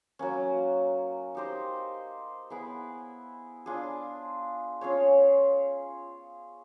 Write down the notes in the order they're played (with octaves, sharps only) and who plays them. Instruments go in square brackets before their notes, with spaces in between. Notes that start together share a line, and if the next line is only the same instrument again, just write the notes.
[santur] F#3 A#3 C#4
D#4 G4 C5 D#5
B3 E4 G#4
D4 F4 G#4
C#4 F4 G#4 C#5